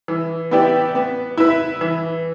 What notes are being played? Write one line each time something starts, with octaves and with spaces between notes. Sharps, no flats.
E3
B3 E4 G4 D5
B3
E4 B4 E5
E3